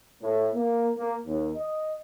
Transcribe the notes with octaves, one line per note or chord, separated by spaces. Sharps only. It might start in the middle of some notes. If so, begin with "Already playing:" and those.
A2
A#3
A#3
D#2
D#5